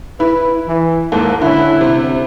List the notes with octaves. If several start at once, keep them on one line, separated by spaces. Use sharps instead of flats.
E4 B4
E3
D#2 G#2 A#3 A4
D3 C#4 E4
C3